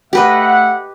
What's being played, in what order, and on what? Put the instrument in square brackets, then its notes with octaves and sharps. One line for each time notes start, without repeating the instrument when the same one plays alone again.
[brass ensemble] A3 E5 F#5 [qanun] G4 B4 D#5